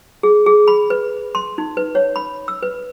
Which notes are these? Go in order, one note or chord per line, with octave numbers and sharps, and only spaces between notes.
G#4
G#4
B5
B4
C6
D#4
B4
C#5
B5
E6
B4